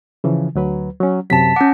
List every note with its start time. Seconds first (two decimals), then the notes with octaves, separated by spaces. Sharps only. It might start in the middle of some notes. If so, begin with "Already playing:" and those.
0.24 C#3 E3 F3
0.55 D2 F#3 B4
1.00 F#3 C#4
1.30 F#2 C3 F#3 A5 B6
1.56 C#4 F#5 D6